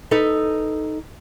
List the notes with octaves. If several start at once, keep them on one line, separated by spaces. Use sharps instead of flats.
D#4 A4 B4